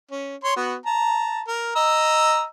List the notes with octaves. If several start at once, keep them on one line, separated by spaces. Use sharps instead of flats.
C#4
C#5 C6
B3 F#4
A5 A#5
A#4
D#5 A#5 E6